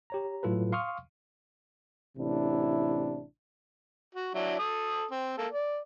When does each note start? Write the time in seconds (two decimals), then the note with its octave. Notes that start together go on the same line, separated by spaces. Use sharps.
0.10 G4 C#5 A#5
0.43 A2 F#3 F4 A4 B4
0.72 F5 C6 C#6 D#6 F6
2.17 A1 C3 D4 E4
4.15 F#4
4.35 F#3 D4 E4
4.59 A4 D#6
5.11 C4
5.38 A#3 A4
5.53 D5